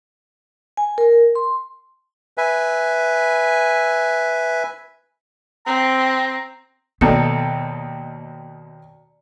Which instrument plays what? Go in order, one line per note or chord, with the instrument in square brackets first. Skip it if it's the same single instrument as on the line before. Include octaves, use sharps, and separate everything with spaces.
[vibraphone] G#5
A#4
C6
[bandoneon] B4 E5 G#5
[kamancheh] C4 [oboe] A#5
[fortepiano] D#2 B2 A4 [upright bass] B3 [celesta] D5 A#5 C#7